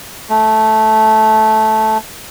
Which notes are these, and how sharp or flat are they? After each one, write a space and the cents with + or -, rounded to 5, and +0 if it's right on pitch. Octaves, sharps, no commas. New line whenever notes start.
A3 -10